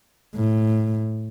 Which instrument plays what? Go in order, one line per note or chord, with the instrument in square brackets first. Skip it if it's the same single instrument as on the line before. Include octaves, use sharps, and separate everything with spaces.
[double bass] A2